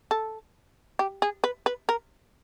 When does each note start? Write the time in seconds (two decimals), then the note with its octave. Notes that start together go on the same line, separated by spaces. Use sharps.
0.11 A4
0.99 G4
1.22 G#4
1.44 B4
1.66 B4
1.89 A#4